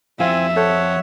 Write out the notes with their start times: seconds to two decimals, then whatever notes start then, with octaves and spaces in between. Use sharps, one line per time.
0.20 F2 F3 C4 E4 F4 E5 F5 G#5
0.56 A4 C5 C#5 F#5